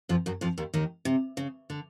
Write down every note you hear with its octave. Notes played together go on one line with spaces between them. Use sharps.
F2 F3
F#2 F#3
F2 F3
D#2 D#3
D#2 D#3
C3
C#3
D3